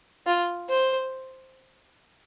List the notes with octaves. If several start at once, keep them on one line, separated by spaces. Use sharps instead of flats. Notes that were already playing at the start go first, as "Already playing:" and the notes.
F4
C5